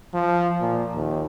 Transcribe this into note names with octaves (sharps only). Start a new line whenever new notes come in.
F3
A#2
D#2